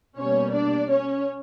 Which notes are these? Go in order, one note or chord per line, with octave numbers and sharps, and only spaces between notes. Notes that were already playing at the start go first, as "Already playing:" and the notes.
B2 G3 A#3 C#4 C#5
D4 D5
C#4 C#5